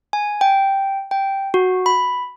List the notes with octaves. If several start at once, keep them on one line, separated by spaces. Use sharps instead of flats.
G#5
G5
G5
F#4
B5